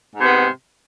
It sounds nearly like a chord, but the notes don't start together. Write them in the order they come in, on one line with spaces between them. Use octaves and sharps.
G#2 C3 B3 G#3